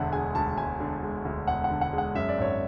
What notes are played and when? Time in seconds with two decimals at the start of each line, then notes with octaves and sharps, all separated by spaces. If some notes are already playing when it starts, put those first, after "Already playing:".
Already playing: E1 D2 D3 E5 F#5
0.13 G#3 G#5
0.35 D2 A5
0.57 E1 G#5
0.80 D3
1.03 G#3
1.25 D2
1.47 E1 F#5
1.64 F#5
1.70 D3
1.81 F#5
1.93 G#3
1.98 F#5
2.15 F#2 E5
2.29 D5
2.38 G#1 C#5